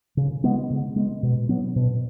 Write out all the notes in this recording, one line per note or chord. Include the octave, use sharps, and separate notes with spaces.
C#3
G#3 B3
C#3
G#3 B3
B2
F#3 B3
B2